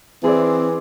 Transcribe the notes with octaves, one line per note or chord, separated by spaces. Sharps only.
E3 C4 G#4 D5